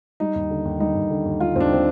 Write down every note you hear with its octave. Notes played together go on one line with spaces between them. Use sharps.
G3 D#4
D#2
D3
D#2
G3 D#4
D#2
D3
D#2
G3 F4
D#2 C4 D4
D3 C4